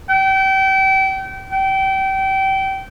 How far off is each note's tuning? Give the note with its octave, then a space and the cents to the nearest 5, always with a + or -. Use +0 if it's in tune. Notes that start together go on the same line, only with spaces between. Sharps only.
G5 -30
G5 -25